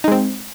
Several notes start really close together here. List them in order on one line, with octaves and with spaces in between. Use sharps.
D#4 G#3 C4